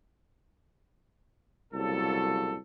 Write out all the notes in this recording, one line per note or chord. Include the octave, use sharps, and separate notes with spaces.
C2 A#2 C#3 F#3 A4